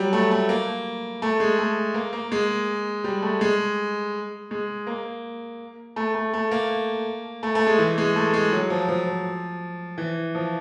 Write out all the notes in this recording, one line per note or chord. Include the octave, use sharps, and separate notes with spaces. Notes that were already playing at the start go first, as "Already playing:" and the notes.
Already playing: F#3 G3
A3
A3
A#3
A3
G#3
A3
A#3
A#3
G#3
G3
A3
G#3
G#3
A#3
A3
A3
A3
A#3
A3
A3
G#3
E3
G#3
A3
G#3
F#3
F3
F3
E3
F3